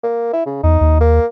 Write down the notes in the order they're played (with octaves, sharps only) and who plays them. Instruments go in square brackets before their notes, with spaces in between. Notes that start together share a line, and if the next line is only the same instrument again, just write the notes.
[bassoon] A#3
E4
C#3
[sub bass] E2 [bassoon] D#4
[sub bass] D#2
[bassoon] A#3